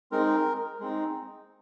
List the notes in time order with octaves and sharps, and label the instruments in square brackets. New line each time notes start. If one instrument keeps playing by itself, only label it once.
[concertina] G#3 C4 D#4 A#4
G#3 C4 D#4